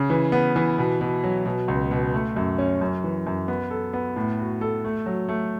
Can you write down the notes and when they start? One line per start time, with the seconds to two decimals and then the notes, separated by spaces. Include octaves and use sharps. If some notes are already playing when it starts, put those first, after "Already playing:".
Already playing: C#3
0.10 E3
0.32 B3
0.56 E3
0.78 B2
1.01 B2
1.24 F#3
1.46 B2
1.68 C#2
1.91 B2
2.14 A3
2.36 F#2
2.58 C#4
2.81 F#2
3.04 E3
3.27 F#2
3.48 B3
3.71 A4
3.94 B3
4.16 A2
4.39 F#4
4.61 A4
4.85 A3
5.06 F#3
5.28 A3